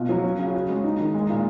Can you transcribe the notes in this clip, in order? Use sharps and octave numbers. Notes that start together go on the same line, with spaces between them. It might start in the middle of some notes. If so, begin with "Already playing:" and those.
Already playing: B2 F4
F#3
C#4
C#3
F#4
G#3
D#4
D#3
G#3
A#2